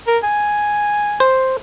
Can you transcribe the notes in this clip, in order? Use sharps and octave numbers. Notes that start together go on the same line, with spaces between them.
A#4
G#5
C5